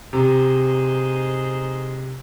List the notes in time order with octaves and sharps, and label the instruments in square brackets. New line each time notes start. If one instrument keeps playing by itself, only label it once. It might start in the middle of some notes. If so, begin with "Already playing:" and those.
[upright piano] C3 [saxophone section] D#4 G#4 C5